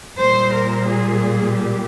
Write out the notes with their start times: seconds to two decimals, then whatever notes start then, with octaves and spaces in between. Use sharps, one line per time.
0.19 A#2 G3 C5
0.54 A#4
0.88 G#4
1.54 G4